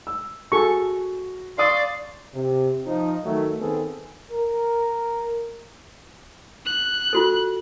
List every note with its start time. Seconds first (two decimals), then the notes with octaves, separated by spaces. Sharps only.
0.07 E6
0.52 F#4 G#4 A4 C#6
1.58 D5 F5 C6 C#6 D#6
2.34 C3
2.86 F3 D#4
3.24 D#3 F#3 A3
3.60 D#3 B3 C4 G#4 A4
4.31 A#4
6.66 F#6
7.13 F4 F#4 A4